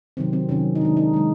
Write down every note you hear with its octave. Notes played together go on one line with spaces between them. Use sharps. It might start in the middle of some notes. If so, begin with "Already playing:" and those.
C3 D#3 F#3 C4
C4
C3 D#3 F#3 C#4
D#4
D#3 G#3 D4
D#4
D#3 G#3